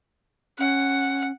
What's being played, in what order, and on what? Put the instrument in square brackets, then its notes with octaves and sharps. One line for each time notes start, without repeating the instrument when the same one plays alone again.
[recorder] C#4 [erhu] F#5